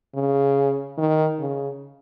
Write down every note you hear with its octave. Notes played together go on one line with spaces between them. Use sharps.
C#3
D#3
C#3